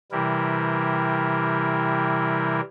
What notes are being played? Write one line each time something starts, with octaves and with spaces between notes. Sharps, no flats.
C3 E3 G3 E4 A#4